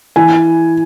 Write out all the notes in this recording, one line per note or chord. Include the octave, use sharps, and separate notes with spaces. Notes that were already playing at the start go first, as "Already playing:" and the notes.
E3 G#5